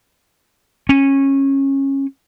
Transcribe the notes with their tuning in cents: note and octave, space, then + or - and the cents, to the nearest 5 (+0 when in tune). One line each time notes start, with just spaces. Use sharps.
C#4 -20